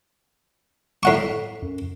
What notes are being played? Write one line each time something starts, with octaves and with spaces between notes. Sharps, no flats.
A2 F#5 C#6
F#2